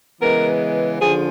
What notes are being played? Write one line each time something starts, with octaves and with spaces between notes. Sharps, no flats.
C#3 E3 G#3 B3 A#4
D3 F3 G#4